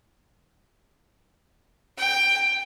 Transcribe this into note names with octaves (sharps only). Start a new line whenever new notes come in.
G5